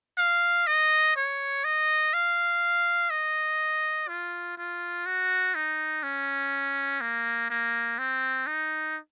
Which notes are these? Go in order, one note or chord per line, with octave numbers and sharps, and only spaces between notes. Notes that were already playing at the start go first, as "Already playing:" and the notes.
F5
D#5
C#5
D#5
F5
D#5
F4
F4
F#4
D#4
C#4
A#3
A#3
C4
D#4